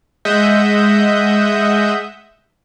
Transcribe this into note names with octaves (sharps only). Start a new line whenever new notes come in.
G#3 D#5 E5 F#5 G6